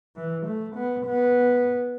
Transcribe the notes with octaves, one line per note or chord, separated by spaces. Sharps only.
E3
A3
B3
B3